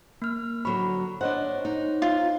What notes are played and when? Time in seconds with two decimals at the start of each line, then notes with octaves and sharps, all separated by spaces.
0.22 A#3 F6
0.65 D3 F#3 C#5 B5
1.21 D4 C5 C#5 D#5 F#5
1.65 D#4
2.02 F4